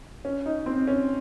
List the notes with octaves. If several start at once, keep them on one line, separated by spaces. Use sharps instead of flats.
C#4
D#4
C4
C#4